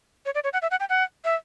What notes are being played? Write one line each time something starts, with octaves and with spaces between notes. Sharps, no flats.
C#5
D5
C#5
F#5
E5
F#5
G5
F#5
E5